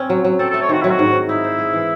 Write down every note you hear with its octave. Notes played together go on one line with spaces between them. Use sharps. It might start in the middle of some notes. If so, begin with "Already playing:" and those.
Already playing: C4 C#4
F#3
F#3
C4 A4
A4
A3
C#5
D#3 F#4
F#3 E4
F#4
G#2
G#2
D#4 E4
C5
G#4
E3